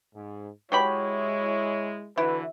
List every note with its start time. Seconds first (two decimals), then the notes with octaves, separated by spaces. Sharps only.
0.15 G#2
0.72 F#3 G#3 E4 G4 C#5 B5
2.18 D3 E3 E4 F#4 B4